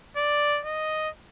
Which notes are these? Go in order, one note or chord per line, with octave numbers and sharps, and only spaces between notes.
D5
D#5